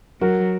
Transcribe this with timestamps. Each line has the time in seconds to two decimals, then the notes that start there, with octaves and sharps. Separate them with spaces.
0.21 F#3 F#4 A#4